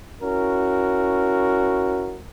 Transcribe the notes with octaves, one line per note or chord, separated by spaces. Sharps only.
C#4 E4 F#4 A#4